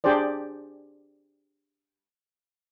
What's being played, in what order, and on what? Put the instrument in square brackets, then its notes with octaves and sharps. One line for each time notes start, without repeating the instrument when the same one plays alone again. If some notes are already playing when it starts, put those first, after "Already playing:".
[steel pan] D4 G4 G#4 C5 D5